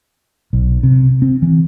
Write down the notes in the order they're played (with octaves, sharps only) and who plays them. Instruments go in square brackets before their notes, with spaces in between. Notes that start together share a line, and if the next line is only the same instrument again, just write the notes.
[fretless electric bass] B1
C3
C4
E3